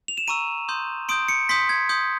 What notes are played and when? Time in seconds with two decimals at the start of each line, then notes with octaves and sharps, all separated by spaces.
0.08 F7
0.17 E7
0.28 A#5 C#6 E6 D#7
0.68 C6 D#6 G6
1.09 C6 D#6 G6 D7
1.29 C#7
1.49 C6 D#6 G6 B6
1.69 G#6
1.89 C6 D#6 G6